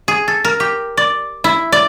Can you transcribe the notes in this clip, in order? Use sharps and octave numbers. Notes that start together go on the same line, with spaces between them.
G#4
A4
A#4
G4
D5
E4
D5